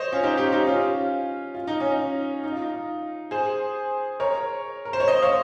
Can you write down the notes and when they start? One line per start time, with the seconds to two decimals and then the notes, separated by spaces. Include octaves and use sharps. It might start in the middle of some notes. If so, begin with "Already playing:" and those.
Already playing: C5 C#5 D#5
0.12 C#4 F4
0.23 D#4 G4
0.37 D#4 G4
0.52 D#4 G4
0.67 C#4 F4
1.55 F4
1.67 D#4
1.80 C#4
1.92 D#4
2.44 D#4
2.52 F4
2.62 D#4
3.31 G#4 C5
4.20 A#4 C#5
4.85 A#4
4.93 C5
5.00 C#5
5.08 C5 D#5
5.22 C#5 F5